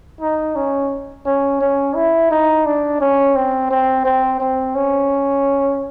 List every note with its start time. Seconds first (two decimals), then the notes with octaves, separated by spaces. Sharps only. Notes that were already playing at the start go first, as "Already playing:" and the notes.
0.21 D#4
0.56 C#4
1.26 C#4
1.61 C#4
1.96 E4
2.31 D#4
2.65 D4
3.01 C#4
3.35 C4
3.70 C4
4.05 C4
4.40 C4
4.75 C#4